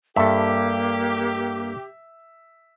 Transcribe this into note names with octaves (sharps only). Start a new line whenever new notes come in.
G2 A#3 G4 A4 E5